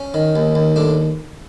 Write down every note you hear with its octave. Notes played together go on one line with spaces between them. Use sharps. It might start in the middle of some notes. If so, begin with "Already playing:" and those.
Already playing: C#4
D#3
D#2
D#2
A2 D4